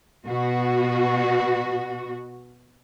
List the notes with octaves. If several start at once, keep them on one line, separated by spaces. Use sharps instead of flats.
B2 F#4